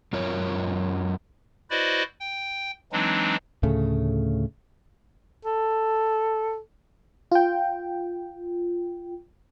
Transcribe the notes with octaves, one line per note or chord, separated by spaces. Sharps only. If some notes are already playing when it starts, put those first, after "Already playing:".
F#2 F4 A#4 C#5
E4 F#4 B4 C5 D5 D#5
G5
E3 F#3 G#3 C4 D4 D#4
D2 A2 C#3 A3
A4
F4 G5